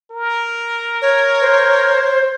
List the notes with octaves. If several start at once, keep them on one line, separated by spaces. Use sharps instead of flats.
A#4
C#5
C5